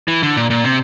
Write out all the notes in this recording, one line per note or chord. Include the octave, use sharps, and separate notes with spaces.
E3
D3
A#2
A#2
C3